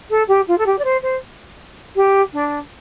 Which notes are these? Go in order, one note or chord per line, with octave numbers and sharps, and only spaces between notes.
A4
G4
F4
A4
G4
D5
C5
C5
G4
D4